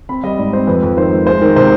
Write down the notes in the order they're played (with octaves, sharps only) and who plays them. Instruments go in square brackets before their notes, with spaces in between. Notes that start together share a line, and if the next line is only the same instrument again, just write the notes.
[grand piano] C4 B5
G3 D#5
G#2 D5
C4 C5
F2 B4
F2
D#3 C5
G#3
G#3 C5
D#3
C3 C5